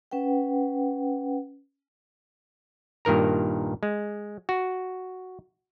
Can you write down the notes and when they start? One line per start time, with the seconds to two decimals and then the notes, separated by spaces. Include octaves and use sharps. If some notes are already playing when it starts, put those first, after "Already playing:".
0.11 C#4 B4 F#5 G5
3.05 G2 A#2 D#3 A#4 A#5
3.83 G#3
4.49 F#4